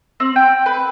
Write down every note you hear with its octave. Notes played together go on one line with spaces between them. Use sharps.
C4
G5
B4